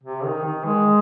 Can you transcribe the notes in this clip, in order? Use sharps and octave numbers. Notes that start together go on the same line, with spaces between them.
C3
D#3
D#3
G#3